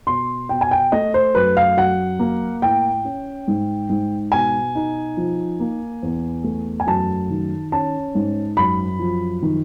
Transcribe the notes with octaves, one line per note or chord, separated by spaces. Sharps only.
B2 C6
B2 G5
G#5
G5
A3 D#5
C5
F#2 B4
F5
F#3 F#5
A#3
A2 G5
C#4
G#2
G#2
B2 G#5
D#4
F3
A#3
E2
A3
G#5
F#2 A5
D#3
C#4 A5
G#2
F#2 B5
F3
D#3